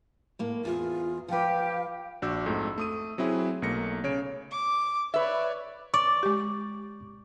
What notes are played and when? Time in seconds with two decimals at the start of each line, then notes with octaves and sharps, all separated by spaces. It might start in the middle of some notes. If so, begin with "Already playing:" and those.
0.39 A2 A#3
0.65 E2 F4 G#4
1.28 F3 G4 B4 F5
2.22 A#1 D4 F#4 D6 E6 G6
2.46 F2 G#2 A3
2.78 A3 D#6 D#7
3.18 F#3 C4 E4 G#4
3.62 B1 A3 A#3 A#6 C#7
4.04 C#3 C#5 D7
4.51 D6
5.14 B4 C#5 D5 E5
5.94 D5 C#6 D6
6.23 G#3 G4